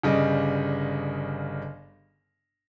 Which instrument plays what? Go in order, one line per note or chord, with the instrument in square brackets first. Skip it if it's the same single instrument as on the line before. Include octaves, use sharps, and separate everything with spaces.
[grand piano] G1 C#3 G3 D#5